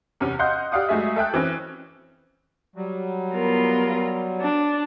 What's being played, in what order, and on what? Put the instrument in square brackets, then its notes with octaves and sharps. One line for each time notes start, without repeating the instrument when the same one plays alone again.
[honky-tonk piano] E2 C3 C#4
D#5 F5 F#5 C6 G6
G4 D5 F5 F#5 D#6
F#3 G#3 A3 G#4 E5
A4 E5 G5 F#6
E3 C4 C#4
[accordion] F#3 G3
[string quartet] B3 F4 A#4
D4